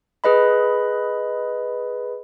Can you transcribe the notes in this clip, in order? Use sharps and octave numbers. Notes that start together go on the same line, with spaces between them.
G#4 B4 D#5 B5